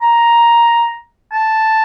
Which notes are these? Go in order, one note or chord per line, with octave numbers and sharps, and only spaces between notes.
A#5
A5